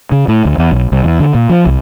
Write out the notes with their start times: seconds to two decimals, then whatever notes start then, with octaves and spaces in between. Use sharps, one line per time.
0.12 C#3
0.28 A2
0.45 D2
0.58 E2
0.72 B1
0.92 C2
1.04 E2
1.20 D3
1.35 A#2
1.50 F3
1.66 C2